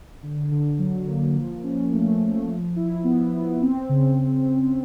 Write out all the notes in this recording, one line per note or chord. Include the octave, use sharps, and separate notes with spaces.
D3
D3
F#3
A#3
F3
C#4
A3
A3
F3
E4
B3
B3
C4
C#3